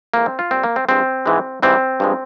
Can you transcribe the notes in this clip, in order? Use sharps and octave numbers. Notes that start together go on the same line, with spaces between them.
F2 E3 G#3 A#3
C4
F4
A#2 G3 C4
A#3
C4
G2 F3 G#3 C4
G#2 E3 G#3
G#2 E3 G3 C4
G2 F3 G#3